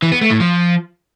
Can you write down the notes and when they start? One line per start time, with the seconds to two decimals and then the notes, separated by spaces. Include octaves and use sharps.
0.02 E3
0.12 B3
0.21 A3
0.31 A2
0.40 F3